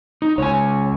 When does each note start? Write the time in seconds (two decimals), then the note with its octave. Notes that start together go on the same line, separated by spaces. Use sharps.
0.22 D#4
0.38 C#2 C#5 G#5